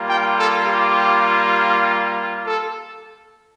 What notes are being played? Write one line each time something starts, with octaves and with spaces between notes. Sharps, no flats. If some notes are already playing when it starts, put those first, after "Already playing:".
Already playing: G3 A#3 F4
G5
A4
G4
A4